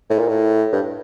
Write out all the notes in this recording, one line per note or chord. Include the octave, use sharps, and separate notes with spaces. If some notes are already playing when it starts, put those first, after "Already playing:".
A2
A#2
A2
G2